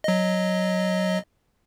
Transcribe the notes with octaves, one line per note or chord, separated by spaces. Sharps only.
F#3 D#5